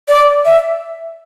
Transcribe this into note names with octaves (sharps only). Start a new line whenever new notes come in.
D5
E5